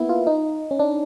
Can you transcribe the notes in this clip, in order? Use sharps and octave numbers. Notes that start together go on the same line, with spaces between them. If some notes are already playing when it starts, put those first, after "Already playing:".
Already playing: A#3 B3 E4
F4
D#4
C#4
D4